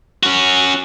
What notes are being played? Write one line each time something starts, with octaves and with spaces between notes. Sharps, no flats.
C#4 F#4